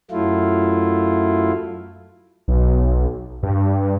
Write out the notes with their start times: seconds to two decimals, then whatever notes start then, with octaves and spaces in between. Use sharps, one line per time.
0.11 F#2 F#3 A3 E4 F4
2.48 B1
3.43 G2